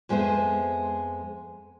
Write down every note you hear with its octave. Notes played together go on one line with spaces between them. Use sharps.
F2 G#3 B3 C5 E5